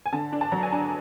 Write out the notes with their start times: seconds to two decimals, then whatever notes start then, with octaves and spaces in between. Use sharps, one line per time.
0.06 G#5
0.13 D3 A5
0.33 D4
0.41 A5
0.52 F#3 A#5
0.63 G#5
0.72 D4 A5